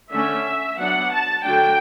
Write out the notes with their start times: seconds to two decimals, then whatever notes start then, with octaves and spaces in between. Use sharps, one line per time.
0.11 D3 A3 C#4 E5
0.78 F#3 B3 D4 F#5
1.11 A5
1.44 D3 F#3 A3 D4 G5